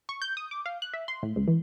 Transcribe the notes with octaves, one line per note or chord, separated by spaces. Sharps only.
C#6
G6
D#6
D6
F5
F#6
E5
C6
A2
C#2
E3